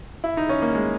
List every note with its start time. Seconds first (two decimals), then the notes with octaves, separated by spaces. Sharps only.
0.24 E4
0.37 D#4
0.49 C#4
0.62 A#3
0.75 G#3